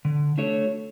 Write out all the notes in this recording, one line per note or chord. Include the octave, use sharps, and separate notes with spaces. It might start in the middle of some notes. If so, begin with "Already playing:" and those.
D3
A3 D4 F#4 C#5